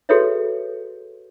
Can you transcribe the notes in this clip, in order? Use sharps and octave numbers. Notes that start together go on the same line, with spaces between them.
F#4 G#4 A4 B4 C#5 E5